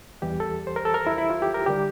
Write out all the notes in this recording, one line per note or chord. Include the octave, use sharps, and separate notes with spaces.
E2 E3 G3 G4
A4
C5
A#4
A4
A#4
E4
E4
F4
G4
A#4
D3 G3 G4